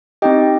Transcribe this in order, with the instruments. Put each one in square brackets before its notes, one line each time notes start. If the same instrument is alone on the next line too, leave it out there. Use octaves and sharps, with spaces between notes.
[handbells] C4 D#4 G4 D#5 G5